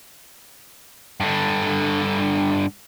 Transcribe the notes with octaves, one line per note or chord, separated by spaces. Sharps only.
G2 D3